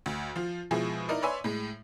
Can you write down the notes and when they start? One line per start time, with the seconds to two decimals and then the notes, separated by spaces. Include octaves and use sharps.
0.06 D2
0.36 F3 F4
0.71 B2 F3 G#3 E4 G#4
1.09 D#4 E4 A#4 D5 D#5
1.22 B4 C#5 D5 E5 G#5 C6
1.44 A2 G#3